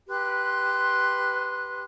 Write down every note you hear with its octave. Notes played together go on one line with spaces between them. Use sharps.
G4 B4 C6 F#6